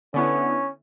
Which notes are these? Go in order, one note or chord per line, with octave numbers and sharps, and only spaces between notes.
D3 B3 C#4 E4